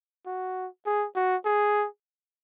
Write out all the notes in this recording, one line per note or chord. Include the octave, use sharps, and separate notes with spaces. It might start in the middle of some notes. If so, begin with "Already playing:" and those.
F#4
G#4
F#4
G#4